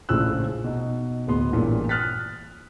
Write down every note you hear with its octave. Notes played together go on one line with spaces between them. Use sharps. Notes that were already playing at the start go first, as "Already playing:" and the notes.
A#1 A2 C#3 F3 E6 F#6
B2 D#4
D1 G#3 B3 C6
A1 G2 A#2 E3
D#6 F6 F#6 A6 B6